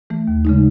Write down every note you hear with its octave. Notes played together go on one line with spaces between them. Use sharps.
E3 A3
D#2
C#3 G#3 D#4